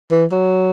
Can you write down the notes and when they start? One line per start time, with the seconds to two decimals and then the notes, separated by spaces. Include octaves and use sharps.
0.11 E3
0.32 F#3